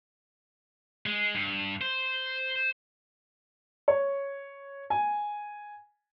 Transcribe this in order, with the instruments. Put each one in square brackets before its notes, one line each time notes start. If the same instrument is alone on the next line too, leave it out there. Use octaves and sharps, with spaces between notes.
[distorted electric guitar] G#3
G2
C5
[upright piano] C#5
G#5